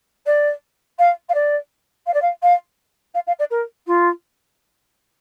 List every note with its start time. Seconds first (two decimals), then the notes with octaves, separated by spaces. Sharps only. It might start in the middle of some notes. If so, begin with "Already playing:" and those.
0.26 D5
0.99 F5
1.29 F5
1.34 D5
2.07 F5
2.14 D5
2.22 F5
2.42 F5
3.14 F5
3.27 F5
3.39 D5
3.51 A#4
3.87 F4